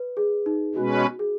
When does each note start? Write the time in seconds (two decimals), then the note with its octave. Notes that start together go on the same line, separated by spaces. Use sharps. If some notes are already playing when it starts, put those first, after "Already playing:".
Already playing: B4
0.17 G#4
0.46 D#4
0.75 B2 G#3 C#4 F#4 B4
1.19 G#4